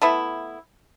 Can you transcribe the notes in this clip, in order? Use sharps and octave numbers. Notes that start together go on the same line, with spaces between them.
A3 B3 E4